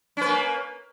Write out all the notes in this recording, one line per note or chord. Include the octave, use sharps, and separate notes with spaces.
A#3 C#4 B4